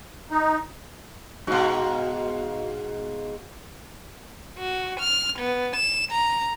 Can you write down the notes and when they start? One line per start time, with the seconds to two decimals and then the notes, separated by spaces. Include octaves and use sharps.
0.31 D#4
1.47 G#2 B2 F#4 F5
4.59 F#4
5.00 F6
5.39 B3
5.76 E7
6.12 A#5